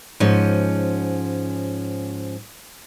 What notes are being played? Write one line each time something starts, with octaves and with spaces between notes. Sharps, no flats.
G#2 F3 C#4